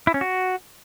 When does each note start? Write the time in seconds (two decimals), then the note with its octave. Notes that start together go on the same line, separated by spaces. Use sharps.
0.07 E4
0.14 C#4
0.21 F#4